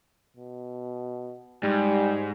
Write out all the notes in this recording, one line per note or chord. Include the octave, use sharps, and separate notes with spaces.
B2
G#2 G3